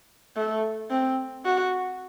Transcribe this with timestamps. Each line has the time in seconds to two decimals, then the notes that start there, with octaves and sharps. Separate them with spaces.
0.36 A3
0.90 C4
1.45 F#4